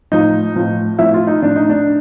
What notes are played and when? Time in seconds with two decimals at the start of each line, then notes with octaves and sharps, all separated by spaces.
0.12 A2 F3 D#4
0.56 A2 F3
0.99 A2 F3 E4
1.14 F4
1.27 D#4
1.42 A2 F3 D4
1.56 D#4
1.69 D4